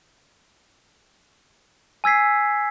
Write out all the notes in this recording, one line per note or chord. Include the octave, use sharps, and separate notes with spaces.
G#5 E6 G#6 B6 C7